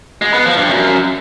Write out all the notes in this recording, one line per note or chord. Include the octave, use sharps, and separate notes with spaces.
G#3
B3
F3
G2
F#2